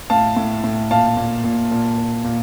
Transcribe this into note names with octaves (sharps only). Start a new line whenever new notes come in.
A2 F5 A5
A2
A2
A#2 F5 A5
A#2
A#2
A#2
A#2
A#2